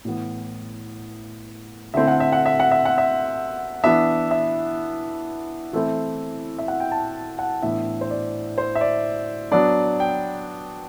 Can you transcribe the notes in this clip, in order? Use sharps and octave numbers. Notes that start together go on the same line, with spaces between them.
A2 E3 B3
D3 A3 C4 E4 E5
F#5
E5
F#5
E5
F#5
E5
F#5
E5
E3 B3 D4 E5
E5
E3 A3 C4 E4
E5
F#5
G5
A5
F#5
A2 E3 B3 D4 E5
C5
D5
C5
E5
D5
F#3 B3 D4 D5
G5